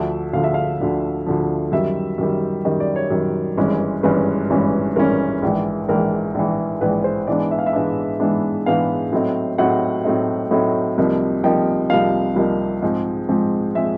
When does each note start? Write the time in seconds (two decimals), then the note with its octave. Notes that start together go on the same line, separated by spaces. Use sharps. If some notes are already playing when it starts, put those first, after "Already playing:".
Already playing: D2 D3 F3 E5
0.33 D2 D3 F3 F5
0.44 E5
0.54 F5
0.80 D2 D3 F3
1.26 D2 D3 F3
1.72 F#2 D#3 G3 E5
2.18 F#2 D#3 G3
2.65 F#2 D#3 G3 D#5
2.80 D5
2.96 C#5
3.11 F#2 D#3 G3
3.57 G#1 G2 E3 G#3 C#4
4.03 G#1 G2 E3 G#3 C#4 B4
4.50 G#1 G2 E3 G#3 C#4
4.96 G#1 G2 E3 G#3 C#4 A#4
5.43 A#1 G#2 E3
5.88 A#1 G#2 E3 A#4
6.35 A#1 G#2 E3
6.81 A#1 G#2 E3 B4
7.04 C5
7.27 G#2 E3 G#3 B3 D4 D5
7.51 E5
7.59 F5
7.66 E5
7.73 G#2 E3 G#3 B3 D4
8.20 G#2 E3 G#3 B3 D4
8.66 G#2 E3 G#3 B3 D4 F5
9.12 A2 F#3 A3 C4 D#4
9.58 A2 F#3 A3 C4 D#4 F#5
10.05 A2 F#3 A3 C4 D#4
10.51 A2 F#3 A3 C4 D#4
10.98 C2 C3 F3 A#3 D#4
11.43 C2 C3 F3 A#3 D#4 G5
11.90 C2 C3 F3 A#3 D#4 F5
12.36 C2 C3 F3 A#3 D#4
12.82 G#2 F3 G#3 C4
13.29 G#2 F3 G#3 C4
13.75 F3 G#3 C4 E5